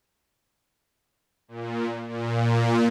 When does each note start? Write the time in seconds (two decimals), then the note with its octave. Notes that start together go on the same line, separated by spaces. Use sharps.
1.48 A#2
2.09 A#2